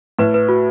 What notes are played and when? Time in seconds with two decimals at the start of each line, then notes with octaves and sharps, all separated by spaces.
0.19 A2 B4
0.34 B4
0.49 F#4